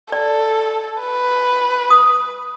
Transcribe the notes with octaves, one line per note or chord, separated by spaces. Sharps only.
A4 D5
B4
D#6